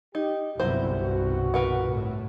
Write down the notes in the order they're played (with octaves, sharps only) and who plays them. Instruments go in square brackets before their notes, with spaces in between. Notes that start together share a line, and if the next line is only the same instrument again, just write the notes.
[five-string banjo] D#4 [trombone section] G4
[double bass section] G1 C2 B2 [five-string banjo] F#3 C5 [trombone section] E4
[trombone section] F#4
[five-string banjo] A#4 B4 F#5
[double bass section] A2